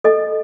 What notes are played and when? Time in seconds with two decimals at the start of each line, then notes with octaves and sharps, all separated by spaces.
0.04 A4 D#5